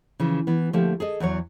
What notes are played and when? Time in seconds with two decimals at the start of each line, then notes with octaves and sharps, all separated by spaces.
0.20 C#3 E3 F3
0.47 E3 B3
0.73 D3 F3 A3 A#3 G4 A4
1.00 G#4 A4 D#5
1.20 E2 E3 F#3 C#5